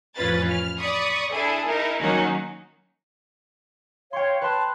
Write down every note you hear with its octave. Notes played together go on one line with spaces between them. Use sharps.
A1 F2 C#4 F4 B4 A6
F6
D5 B5 C#6 D#6
D4 E4 G#4 A4
D#4 E4 A#4
D#3 F#3 A#3 C#4 D#4 F#4
C#5 F5 G5 C6
B4 A5 C6 F#6